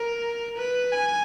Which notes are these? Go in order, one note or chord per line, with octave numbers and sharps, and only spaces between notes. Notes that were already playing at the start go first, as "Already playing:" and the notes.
Already playing: A#4
B4
G#5